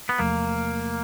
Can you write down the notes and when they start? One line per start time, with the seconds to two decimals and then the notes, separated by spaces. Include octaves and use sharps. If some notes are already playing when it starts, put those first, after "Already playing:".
0.09 B3
0.19 E2 C3 F3 A3 A#3